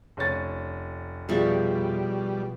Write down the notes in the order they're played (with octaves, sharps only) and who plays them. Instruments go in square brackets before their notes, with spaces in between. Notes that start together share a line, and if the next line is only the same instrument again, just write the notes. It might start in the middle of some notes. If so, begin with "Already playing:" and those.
[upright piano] F1 C#4 A6
[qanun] B2 F3 C#6 [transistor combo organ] G3 [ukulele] G#4 D5 E5